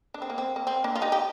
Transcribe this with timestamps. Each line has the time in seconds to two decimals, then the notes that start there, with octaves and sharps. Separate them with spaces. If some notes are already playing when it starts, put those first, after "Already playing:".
0.14 D4
0.22 C4
0.30 A#3
0.38 C4
0.56 A#3
0.67 C4
0.84 A#3 D4
0.95 F4
1.02 D#4 G4
1.12 G4